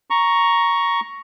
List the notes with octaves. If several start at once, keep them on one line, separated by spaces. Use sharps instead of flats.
A#5 C#6